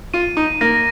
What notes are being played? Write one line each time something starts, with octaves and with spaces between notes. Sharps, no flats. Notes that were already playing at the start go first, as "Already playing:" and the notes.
F4 D#7
D#4
A#3 A#6